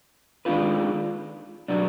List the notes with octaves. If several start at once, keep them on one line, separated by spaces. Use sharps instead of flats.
D#3 G#3 D4 F4 B4
B2 F#3 B3 D4 F#4